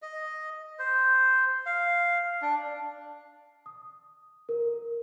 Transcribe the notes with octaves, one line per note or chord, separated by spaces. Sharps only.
D#5
C5
F5
D4
D#6
A#4